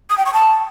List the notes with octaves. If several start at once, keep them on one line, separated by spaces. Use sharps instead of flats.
D#6
G5
C#6
A5